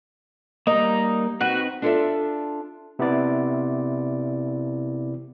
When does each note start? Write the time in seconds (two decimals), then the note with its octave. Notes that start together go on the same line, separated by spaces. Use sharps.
0.67 G3 A#3 D#4
1.41 C4 D#4 F#4 B4
1.82 D4 F4 A4 C#5 D5 E5
2.99 C3 B3 E4 D5